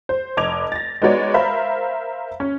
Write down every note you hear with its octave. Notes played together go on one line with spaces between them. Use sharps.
C5
F1 D#5 D6 G#6 F7
A6 A#6
G#3 B3 D#4 F#4 C#5 D5
A#4 C5 E5 F5 B5
C#4